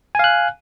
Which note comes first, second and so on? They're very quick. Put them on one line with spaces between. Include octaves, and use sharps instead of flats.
G#5 F5 F#6